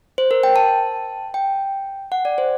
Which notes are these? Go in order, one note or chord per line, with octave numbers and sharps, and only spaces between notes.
C5
A#4
G5
A5
G5
F#5
D5
C5